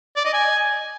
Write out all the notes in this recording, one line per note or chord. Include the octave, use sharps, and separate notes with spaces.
D5
D#5
G#5